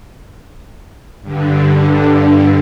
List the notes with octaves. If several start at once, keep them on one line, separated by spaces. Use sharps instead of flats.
G2 D3